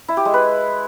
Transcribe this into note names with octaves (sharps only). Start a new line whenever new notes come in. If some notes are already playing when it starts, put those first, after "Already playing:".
E4
G4
G#3
B4